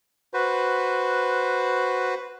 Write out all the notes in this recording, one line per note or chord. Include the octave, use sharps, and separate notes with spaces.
F#4 B4 C5